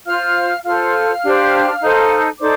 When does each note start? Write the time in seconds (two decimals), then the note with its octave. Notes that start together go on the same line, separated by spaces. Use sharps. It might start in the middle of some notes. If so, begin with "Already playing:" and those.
0.06 F4 C5 F5 F6
0.64 F4 A4 C5 F5 F6
1.23 D4 G4 C5
1.81 D#4 A4 C5
2.39 D#4 A4 C5 D5 D6